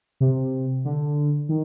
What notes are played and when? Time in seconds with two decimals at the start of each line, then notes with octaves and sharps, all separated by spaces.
0.20 C3
0.85 D3
1.49 D#3